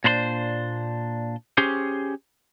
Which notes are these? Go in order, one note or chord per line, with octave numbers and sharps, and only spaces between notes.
A#2 D4 C5 B5 C6
C#4 G4 G#4 C5